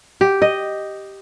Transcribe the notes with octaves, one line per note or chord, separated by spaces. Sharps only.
G4
D#5